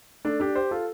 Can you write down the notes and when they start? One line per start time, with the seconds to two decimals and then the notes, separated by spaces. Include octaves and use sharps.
0.25 A3 D4
0.40 D4 G4
0.55 G4 C5
0.71 F4 A4